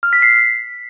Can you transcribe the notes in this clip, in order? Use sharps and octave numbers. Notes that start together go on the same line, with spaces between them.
F6
B6
C7